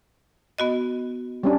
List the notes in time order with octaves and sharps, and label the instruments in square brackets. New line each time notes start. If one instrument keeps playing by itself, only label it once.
[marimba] B3 F#4 D#5
[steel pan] G3 C#4 D4